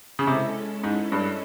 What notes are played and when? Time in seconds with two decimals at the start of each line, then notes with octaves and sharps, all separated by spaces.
0.19 C#3
0.27 C3 G#3 C#4 E4 A4
0.84 G#2
1.12 G2